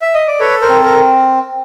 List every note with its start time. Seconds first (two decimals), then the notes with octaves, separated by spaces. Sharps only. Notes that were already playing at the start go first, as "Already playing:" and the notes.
0.02 E5
0.14 D#5
0.28 D5
0.40 A4 B4 C#5
0.62 A#4 C5
0.69 C4
0.84 A#4